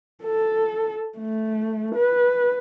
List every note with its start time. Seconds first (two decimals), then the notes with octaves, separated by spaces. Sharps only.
0.24 A4
1.19 A3
1.96 B4